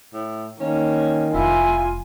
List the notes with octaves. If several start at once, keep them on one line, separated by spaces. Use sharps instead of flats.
A2
D#3 A#3 C#4
F1 F3 E4 F4 G#5